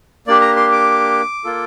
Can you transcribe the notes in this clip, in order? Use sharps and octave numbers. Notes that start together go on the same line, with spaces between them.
A#3 D4 G4 D5
A#5
C6
D6
A#3 F4 A4